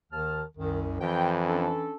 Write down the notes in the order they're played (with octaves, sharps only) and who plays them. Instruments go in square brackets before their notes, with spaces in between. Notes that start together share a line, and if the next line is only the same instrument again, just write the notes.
[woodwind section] D#2 A5 F6 [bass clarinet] D#3
[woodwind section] C2 F#2 [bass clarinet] D#3
[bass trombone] F2 [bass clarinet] E3 [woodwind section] G5
[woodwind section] C#4 D4 A4